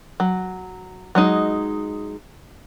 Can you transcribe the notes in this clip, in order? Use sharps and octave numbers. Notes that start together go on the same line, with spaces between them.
F#3
F#3 G#3 D#4